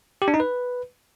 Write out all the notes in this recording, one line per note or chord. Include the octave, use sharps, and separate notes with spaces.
G4
D4
D#4
B4